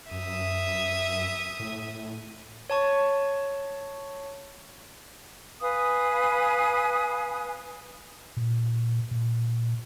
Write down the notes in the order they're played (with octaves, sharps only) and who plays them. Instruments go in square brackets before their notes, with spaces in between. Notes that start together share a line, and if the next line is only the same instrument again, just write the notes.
[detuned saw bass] F#2 [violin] E5 D#6
[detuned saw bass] A2
[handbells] C#5 A5 C#6
[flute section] B4 F5 G#5 D#6
[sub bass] A#2
A#2